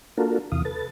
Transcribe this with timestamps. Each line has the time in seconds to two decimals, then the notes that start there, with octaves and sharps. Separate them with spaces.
0.17 A#3 D4 F4 F#4 A4 A#4
0.52 E2 C3 E3 F5 D#6
0.65 A4 B4 A6